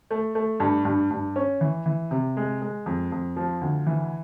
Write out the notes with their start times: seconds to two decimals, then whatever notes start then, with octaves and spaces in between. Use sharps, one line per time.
0.11 A3
0.35 A3
0.60 G2
0.85 G2
1.10 G2
1.36 C#4
1.61 E3
1.86 E3
2.11 C3
2.37 G#3
2.61 G#3
2.86 F2
3.12 F2
3.36 F3
3.61 D2
3.87 E3